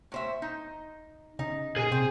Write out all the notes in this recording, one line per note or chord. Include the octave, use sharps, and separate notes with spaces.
A2 C5 E5
D#4
C#3 D#4
A#2 G#4 G#5
C3 C4